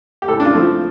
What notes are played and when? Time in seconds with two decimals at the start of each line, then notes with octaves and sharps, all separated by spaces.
0.22 G4
0.28 A2 A4
0.40 D4
0.45 F4
0.53 F3 A3 C4